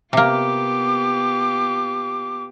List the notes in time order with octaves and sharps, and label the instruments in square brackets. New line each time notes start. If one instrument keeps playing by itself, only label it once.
[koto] C3 A#3 [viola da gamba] B3 F4 G4 [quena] D6